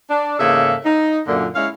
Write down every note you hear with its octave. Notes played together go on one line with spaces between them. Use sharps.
D4
E2 G#2 C#3 A#3 A4 E5
D#4
F#2 A#2 D3
G#3 C#4 E4 C#5 F5